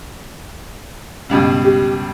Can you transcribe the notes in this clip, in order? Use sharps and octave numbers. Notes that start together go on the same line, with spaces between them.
C#2 G2 B2
G4